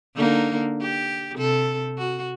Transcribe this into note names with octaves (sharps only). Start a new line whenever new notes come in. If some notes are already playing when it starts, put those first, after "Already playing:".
D3 A#3 D#4
G4
C3 A4
F#4